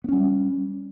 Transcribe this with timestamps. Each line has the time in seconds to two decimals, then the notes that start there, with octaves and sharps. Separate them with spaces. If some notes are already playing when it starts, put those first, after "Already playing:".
0.04 B3
0.08 C#4
0.13 G3